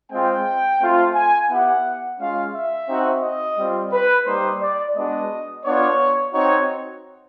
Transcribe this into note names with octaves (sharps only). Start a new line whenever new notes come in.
G#3 C4 F4 G5
A3 C4 F4
G#5
B3 E4 G4 F#5
G#3 C#4 F4 F5
E5
C4 D#4 F#4
D#5
G3 C4 F4
B4
G3 A#3 D#4 G4 C5
D5
G#3 B3 D4 F#4 D#5
B3 D4 F4 C#5
C4 D#4 F#4 C#5